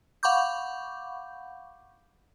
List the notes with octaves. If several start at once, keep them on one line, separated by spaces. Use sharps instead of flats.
F5 F#5 B5 C#6 D6 G6